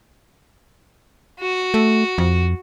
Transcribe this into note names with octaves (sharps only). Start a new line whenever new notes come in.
F#4
A3
F2